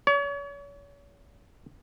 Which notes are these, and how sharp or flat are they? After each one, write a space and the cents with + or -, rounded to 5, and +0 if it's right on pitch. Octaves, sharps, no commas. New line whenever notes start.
C#5 +40